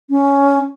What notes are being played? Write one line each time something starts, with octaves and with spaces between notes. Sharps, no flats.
C#4